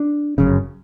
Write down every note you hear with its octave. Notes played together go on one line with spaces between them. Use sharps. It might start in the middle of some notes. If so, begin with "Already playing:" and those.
Already playing: D4
G1 F#2 C#3